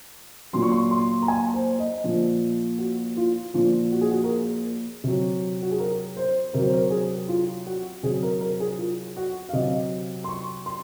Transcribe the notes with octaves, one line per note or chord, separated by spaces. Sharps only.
A#2 F#3 C6
C#6
C6
C6
A#5
G#5
C5
D#5
A#2 F3
F#4
F4
A#2 F3 F4
F#4
G#4
F#4
A#4
G#4
C3 F#3
F#4
G#4
A#4
C5
C3 F#3 A#4
C5
A#4
G#4
F4
F#4
C3 F#3 G#4
A#4
A#4
G#4
F4
F#4
F5
C3 F#3 D#5
C6
C#6
C6